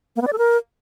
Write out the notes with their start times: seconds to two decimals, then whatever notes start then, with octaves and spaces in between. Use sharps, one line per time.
0.16 A#3
0.22 B3
0.27 D5
0.33 A4
0.38 A#4